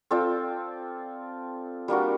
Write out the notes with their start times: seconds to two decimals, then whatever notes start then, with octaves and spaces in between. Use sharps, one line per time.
0.11 C4 F4 A4 D5
1.88 G3 A#3 D4 F#4